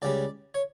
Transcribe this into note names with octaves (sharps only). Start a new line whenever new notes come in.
C#2 C#3 G3 D5
C#5